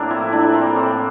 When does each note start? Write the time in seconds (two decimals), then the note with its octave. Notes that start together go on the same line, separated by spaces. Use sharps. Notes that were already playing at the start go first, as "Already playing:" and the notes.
Already playing: A2 A#3 C4 D4
0.10 F3 E4
0.32 A2 D4
0.54 A#3 C4
0.75 A2 C4